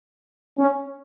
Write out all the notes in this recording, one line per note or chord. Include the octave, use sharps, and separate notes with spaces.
C#4